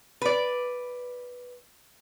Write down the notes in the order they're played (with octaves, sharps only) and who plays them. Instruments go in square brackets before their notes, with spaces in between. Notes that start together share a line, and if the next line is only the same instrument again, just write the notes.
[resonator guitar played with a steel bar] B4 D5